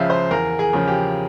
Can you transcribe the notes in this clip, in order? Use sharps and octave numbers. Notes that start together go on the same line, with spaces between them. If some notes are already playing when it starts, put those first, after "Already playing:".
Already playing: C#2 C#3 F3 E5 F5
C5
E2 A#4
G#4
C#3 F3
G4